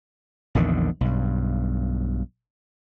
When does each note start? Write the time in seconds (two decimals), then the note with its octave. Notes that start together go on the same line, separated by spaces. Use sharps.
0.55 A#1 E2 D3 D#3
1.01 B1 G2